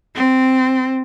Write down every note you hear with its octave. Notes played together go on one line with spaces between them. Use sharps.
C4